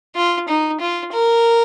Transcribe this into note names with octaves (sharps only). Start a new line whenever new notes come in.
F4
D#4
F4
A#4